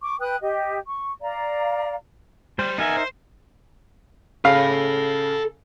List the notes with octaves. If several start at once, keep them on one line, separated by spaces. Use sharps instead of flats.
C#6 D6
B4 G5 D#6 F#6
G4 D#5
C#6
D5 F5 A#5
G3 C5
B3 D#4 A#4 E5 G#5
C5
C#3 A4 F5 B5